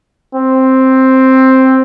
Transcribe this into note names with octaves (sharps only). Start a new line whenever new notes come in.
C4